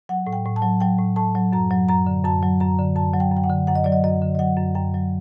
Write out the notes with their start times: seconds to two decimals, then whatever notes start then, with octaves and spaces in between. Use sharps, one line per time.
0.09 F#3 F#5
0.27 A2
0.33 G5
0.45 A2
0.56 A5
0.62 F#3
0.80 F#3 G5
0.98 A2
1.16 A2 A5
1.35 F#3
1.52 F#2 A#5
1.71 F#3
1.89 F#2 A#5
2.07 D3
2.24 F#2 A5
2.42 F#3
2.60 F#2 A#5
2.79 D3
2.96 F#2 A5
3.14 F#3
3.20 G5
3.32 F#2 G5
3.44 F#5
3.49 D3
3.67 F#2 F#5
3.75 D#5
3.84 F#3 D5
3.92 D#5
4.03 F#2 D#5
4.22 D3
4.35 D#5
4.39 F#3 F#5
4.57 F#2
4.75 F#2 G5
4.94 F#3